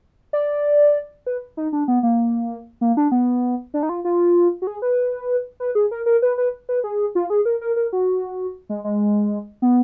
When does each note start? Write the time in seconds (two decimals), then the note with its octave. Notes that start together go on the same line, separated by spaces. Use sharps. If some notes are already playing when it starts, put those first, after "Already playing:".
0.33 D5
1.27 B4
1.57 D#4
1.73 D4
1.88 B3
2.03 A#3
2.81 A#3
2.97 D4
3.12 B3
3.74 D4
3.83 D#4
3.89 F4
4.05 F4
4.62 F#4
4.67 G#4
4.82 B4
5.60 B4
5.75 G#4
5.91 A#4
6.06 A#4
6.22 B4
6.38 B4
6.69 B4
6.84 G#4
7.15 F4
7.30 G#4
7.45 A#4
7.61 A#4
7.76 A#4
7.93 F#4
8.69 G#3
8.84 G#3
9.62 B3